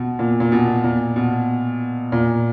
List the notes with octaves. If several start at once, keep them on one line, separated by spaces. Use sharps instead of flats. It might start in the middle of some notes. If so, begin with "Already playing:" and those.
Already playing: B2
A#2
A#2
B2
A#2
B2
A#2